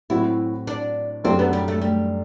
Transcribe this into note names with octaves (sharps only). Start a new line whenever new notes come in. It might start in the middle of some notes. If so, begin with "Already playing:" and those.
A2 F#3 C4 E4 F#4
D4
F#2 F#3 A3 C4 D4 G4
B3
G3
A3
G3